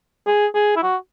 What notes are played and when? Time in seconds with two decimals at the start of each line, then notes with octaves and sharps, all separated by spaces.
0.26 G#4
0.55 G#4
0.76 E4
0.83 F#4